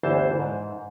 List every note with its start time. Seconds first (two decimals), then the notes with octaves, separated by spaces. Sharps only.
0.03 G1 D2 E3 C5 A5
0.39 G#2